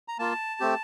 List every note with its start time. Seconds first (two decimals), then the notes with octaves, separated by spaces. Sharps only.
0.08 A#5
0.19 A#3 F4 A5
0.60 A3 C4 G4